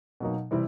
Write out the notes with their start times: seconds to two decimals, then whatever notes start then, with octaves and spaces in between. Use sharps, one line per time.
0.20 B2 F#3 A#3 D#4
0.51 C3 E3 G3 C4 E4